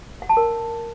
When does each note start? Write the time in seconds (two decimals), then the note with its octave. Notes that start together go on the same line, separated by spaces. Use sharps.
0.22 F#5
0.29 A5
0.37 A#4